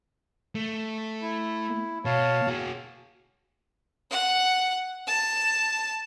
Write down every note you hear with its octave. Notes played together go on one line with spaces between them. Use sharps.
A3
E4
B2 C#5 F5 A5
F#4 G#4
F#5
A5